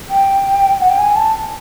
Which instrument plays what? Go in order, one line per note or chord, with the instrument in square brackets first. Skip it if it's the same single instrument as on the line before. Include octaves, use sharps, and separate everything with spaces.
[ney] G5
F#5
G5
G#5
A5